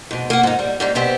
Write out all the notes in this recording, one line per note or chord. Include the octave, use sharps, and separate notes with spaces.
G#2 B2
A#3 F#5
G#2 D#4
G3
G#2 G3 A#3
B2 B3 C4 G4 C5 E5